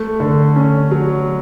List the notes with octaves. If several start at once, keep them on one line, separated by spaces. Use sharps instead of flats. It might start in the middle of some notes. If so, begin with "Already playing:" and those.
Already playing: A3
D3
C#4
F#3